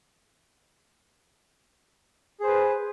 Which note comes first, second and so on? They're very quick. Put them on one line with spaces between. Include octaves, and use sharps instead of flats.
G#4 C5 B4